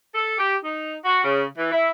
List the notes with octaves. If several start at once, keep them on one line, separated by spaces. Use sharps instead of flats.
A4
G4
D#4
F#4
C#3
E3
E4